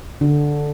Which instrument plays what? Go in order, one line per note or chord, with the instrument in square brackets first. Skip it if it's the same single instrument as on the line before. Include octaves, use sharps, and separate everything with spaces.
[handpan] D3